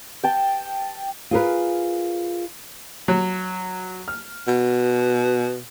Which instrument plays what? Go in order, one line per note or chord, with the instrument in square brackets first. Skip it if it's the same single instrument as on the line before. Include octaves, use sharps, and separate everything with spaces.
[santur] G5 A5
[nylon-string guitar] F4 G#4 A#4 B4
[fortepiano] F#3
F6
[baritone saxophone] B2